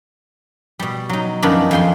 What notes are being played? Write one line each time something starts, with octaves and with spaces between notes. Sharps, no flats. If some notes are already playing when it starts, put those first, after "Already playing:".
B2 G3
F#3 D#4
F#2 D#3 F3 B3 D4 B5
F2 F3 G5 G#5 C6